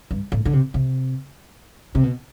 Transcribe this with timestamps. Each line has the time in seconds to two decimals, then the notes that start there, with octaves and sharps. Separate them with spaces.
0.11 G2
0.32 A2
0.45 D3
0.53 C3
0.74 C3
1.95 C3
2.04 B2